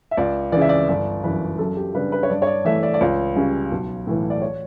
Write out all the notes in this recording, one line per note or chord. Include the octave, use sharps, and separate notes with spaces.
E5
C#2 D5
C#3 E3 D5
E5
D5
G1 D5
F#2 E3 B4
F#2 A4
G4
C#3 G3 D4 B4
B4
C#5
G2 D5
C#5
D5
E3 A3 E5
D5
D5
C#2 C#5
C#3 G3 C#4
B1
A2 E3
D5
C#5